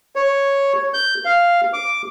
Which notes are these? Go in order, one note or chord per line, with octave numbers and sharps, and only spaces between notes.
C#5
G6
F5
D6